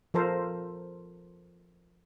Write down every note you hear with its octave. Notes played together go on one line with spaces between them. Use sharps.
F3 A4 A#4 C5